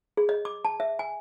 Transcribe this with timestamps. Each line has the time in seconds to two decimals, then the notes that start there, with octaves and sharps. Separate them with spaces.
0.17 G#4
0.29 D#5
0.45 D6
0.65 A5
0.80 E5
0.99 G#5